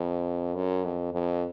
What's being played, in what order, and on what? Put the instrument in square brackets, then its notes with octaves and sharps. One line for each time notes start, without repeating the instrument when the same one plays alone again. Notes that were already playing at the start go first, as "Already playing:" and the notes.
Already playing: [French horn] F2
F#2
F2
F2